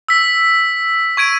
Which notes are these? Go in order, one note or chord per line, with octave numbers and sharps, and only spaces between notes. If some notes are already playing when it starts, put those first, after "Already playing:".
E6 B6
C#6 G#6 D7 D#7